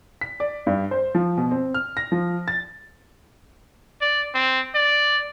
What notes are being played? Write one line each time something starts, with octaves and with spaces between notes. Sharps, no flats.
B6
D5
G2
C5
F3
B2
C4
F6
A#6
F3
A6
D5
C4
D5